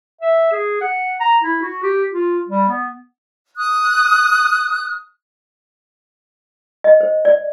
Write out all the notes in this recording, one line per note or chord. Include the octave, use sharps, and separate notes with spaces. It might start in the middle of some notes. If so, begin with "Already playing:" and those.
E5
G#4
F#5
A#5
E4
F#4
G4
F4
G3
B3
D#6 F#6
D#5
C5
D5